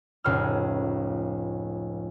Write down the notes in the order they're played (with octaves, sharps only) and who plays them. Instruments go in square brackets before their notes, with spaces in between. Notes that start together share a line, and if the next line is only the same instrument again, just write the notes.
[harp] F1 C#2 A2 F6